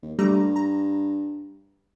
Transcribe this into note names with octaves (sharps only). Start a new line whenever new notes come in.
D#2
G2 G3 A3 A#5
A#5